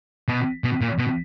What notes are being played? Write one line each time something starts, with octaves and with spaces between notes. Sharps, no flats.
B2
B2
A#2
B2